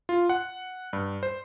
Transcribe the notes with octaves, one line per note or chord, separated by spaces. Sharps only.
F4
F#5
G2
C5